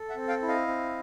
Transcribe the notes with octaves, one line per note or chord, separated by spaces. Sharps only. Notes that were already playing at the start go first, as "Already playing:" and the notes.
Already playing: A4
E5 F#5
C4
F5 G5
E4
D#5 F5
C4